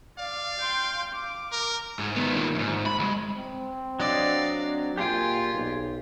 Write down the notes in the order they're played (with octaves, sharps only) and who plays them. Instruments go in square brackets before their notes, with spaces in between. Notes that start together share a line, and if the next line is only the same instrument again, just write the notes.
[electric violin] D5 [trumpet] F5
[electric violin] G5 C6
D6
[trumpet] A#4
[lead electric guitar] G#2
D#3 B3
A#2 D#3
E2 G#2
B5
D#2 G#3
[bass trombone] C4
[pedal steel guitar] F#3 D4 D#5 [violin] D5 F5
[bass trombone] A#2 [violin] F4 [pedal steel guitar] G4 G#4 G5
[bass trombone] B1